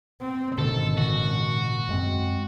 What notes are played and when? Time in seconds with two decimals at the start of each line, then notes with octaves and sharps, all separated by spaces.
0.21 C4
0.58 G#1 B2 D3 D#3 A4
0.98 A#2 C#3 F#4
1.89 F#2 G#3 C4